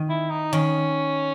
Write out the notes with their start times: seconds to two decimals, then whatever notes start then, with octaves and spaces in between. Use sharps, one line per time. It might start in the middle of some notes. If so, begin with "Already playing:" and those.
Already playing: D#3
0.09 E4
0.30 D#4
0.53 D#3 C#4